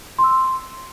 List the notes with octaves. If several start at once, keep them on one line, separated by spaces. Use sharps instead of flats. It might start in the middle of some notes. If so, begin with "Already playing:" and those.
C6
E6
C6